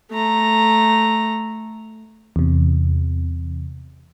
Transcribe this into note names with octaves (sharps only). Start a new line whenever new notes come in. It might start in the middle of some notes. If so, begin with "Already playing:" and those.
A3 A#5
E2 C3